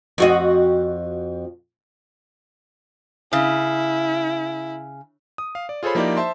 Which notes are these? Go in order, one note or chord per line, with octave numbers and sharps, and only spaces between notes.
F2 F#4 D#5
C#3 E4
D#6
F5
D5
F4 G#4 A4 C5 C#5 B5
F3 A#3 D#4 E4 G4 D5
C5 E5 A5 C6